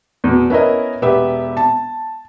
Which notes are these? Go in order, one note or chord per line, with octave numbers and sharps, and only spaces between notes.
E2 B2
B3 C#4 E4 A#4 D#5
E1 B3 G4 E5
A5